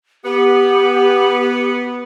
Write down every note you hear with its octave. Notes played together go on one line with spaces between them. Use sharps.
B3 G4